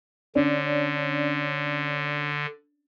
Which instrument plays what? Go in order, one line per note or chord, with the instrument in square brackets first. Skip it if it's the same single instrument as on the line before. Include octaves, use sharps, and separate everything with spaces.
[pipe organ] D3 [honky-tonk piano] C#4 D4